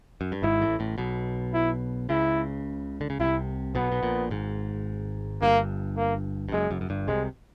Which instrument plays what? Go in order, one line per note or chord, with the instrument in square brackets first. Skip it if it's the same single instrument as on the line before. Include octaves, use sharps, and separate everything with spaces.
[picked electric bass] F#2
G2
[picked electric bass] G#1 G#2 [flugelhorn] E4
[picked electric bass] A1 A2
A1 A2
B1 B2
[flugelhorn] E4
[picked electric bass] C#2 C#3 [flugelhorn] E4
[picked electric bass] D3
C#3
[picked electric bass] C2 C3 [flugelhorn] E4
[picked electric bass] B1 B2 [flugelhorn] B3
[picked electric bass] B2
A#1 A#2
G#1 G#2
[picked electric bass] G1 G2 [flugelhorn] A#3
[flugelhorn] A#3
[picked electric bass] G2
[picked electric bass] F#1 F#2 [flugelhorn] G#3
[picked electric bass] F#1 F#2
F#2
G1 G2
[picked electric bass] C2 C3 [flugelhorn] G#3